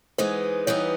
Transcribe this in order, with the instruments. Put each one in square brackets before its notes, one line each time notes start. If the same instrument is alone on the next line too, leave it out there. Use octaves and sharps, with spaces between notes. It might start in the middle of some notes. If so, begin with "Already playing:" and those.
[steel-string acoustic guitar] E3 G#3 B3 D#4 [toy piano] C5
[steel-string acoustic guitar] E3 G3 B3 D#4 [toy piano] C#5